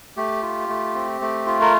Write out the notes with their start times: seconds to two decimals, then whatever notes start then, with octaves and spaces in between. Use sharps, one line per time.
0.17 A3 G4
0.42 F4
0.69 A3
0.95 C4
1.21 A3
1.47 F4
1.61 A#4